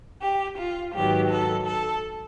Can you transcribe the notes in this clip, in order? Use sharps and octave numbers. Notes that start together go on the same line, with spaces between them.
G4
F4
G#2 D#3 F#3 B3 G4
A4
A4